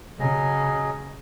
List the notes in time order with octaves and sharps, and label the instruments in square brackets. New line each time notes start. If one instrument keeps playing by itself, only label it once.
[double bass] C#3 [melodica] F#3 G#4 D#5